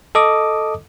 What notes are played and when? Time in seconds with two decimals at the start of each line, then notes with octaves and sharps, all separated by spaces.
0.15 A4 D#5 D6 D#6